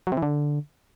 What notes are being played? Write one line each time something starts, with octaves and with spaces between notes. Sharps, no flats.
F#3
C3
E3
D3